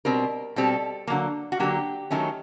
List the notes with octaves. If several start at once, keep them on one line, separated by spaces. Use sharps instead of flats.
B2 G3 C4 A#4
B2 G3 C4 A4
D3 F#3 A#3
F#4
D3 F#3 A#3 G4
D#3 F#3 A3 C#4